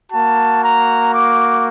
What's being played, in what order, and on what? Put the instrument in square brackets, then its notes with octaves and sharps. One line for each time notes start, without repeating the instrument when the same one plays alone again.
[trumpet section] A#3 F#4 A5
A#5
D6